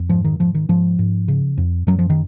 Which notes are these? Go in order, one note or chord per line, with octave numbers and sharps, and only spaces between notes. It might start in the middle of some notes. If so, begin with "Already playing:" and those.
Already playing: F2
G#2 F3
D#3
G#2 F3
D#3
G#2 F3
G#2
C#3
F2
F#2 F#3
F3
D#3